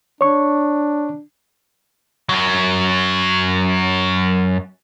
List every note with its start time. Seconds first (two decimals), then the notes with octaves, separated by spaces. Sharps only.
0.21 D4 C#5 C#6
2.29 F#2 F#3